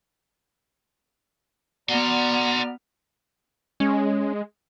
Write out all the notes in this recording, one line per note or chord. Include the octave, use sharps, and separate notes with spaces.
B3 F#4 D5 F#5 A#5 C6 F6
G#3 C#4